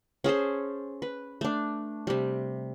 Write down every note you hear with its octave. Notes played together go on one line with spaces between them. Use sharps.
C#4 G#4 A4 C5
B4
A3 D4
C3 G3